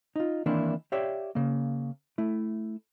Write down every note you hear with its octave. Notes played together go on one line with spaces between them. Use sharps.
D#4 F4
D#3 E3 A#3 C4 D4 E4
G4 C#5 D5 E5 F5 G5
C#3 A#3
A3 E4